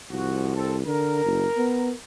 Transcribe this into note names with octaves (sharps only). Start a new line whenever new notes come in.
C2 F3 F#4
C4 A4
D3 A#4
F#1
B3